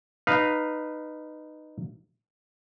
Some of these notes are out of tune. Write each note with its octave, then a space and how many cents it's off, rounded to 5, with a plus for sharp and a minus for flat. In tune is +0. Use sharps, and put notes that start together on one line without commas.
D#4 -15 B4 +0 F5 +0